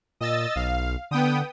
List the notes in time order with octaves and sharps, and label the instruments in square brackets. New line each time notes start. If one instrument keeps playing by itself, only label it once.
[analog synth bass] A#2 [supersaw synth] D#5 E6 A6
[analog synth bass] B1 [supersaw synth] F5
[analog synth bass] D3 [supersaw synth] B3 G5 D#6